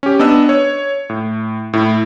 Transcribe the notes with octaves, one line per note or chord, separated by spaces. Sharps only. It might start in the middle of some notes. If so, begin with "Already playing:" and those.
C#4 G4
B3 D4 D#5 E6
C#5
A2
A2 E4